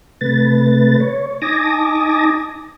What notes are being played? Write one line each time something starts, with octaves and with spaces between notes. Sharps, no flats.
C3 A3 B4 A6
C#5
D#4 G#5 A5 D6 D#6 A#6